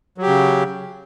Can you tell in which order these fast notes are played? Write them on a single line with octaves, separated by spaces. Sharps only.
F#3 G4 C#3